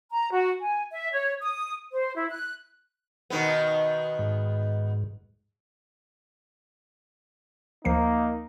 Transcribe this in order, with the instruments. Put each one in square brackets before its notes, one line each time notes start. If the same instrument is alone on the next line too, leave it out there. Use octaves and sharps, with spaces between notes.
[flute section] A#5
F#4
G#5
E5
C#5
D#6
C5
E4
F#6
[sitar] B2 D#3 B3
[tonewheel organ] G#2
[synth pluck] D2 F3 C7 [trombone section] A#3 D#4